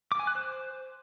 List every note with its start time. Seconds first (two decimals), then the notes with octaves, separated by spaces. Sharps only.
0.12 D6
0.19 G#5
0.27 F#6
0.35 C5